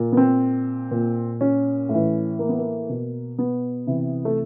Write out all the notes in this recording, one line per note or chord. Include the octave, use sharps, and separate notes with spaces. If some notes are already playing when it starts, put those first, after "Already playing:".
Already playing: A#2
B3
C4
A#2
C#4
A2 E3
A#3
B3
A#3
B2
B3
C3 E3
A3